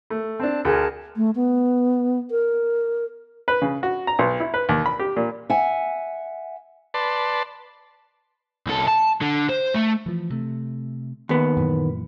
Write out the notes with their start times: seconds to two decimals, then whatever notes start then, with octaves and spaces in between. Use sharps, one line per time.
0.10 A3
0.40 C4 D4 A5
0.65 D2 G#4 A#4 A5
1.16 A3
1.36 B3
2.31 A#4
3.48 B4
3.62 C#3
3.83 F#4
4.07 A#5
4.19 B1
4.40 E4
4.54 B4
4.69 D#2
4.86 B5
4.99 G4
5.16 A#2
5.50 E5 F#5 G#5
6.94 B4 D5 A5 C6
8.67 C2 A4
8.88 A5
9.21 D3
9.50 C5
9.75 A3
10.06 E3 F3
10.30 C3 A3
11.29 D#2 B3
11.57 F#2 A#2 E3